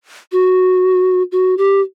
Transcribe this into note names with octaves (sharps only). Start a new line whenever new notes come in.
F#4
F#4
G4